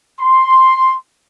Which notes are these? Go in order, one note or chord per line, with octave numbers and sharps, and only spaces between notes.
C6